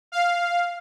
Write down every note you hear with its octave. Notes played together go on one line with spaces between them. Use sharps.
F5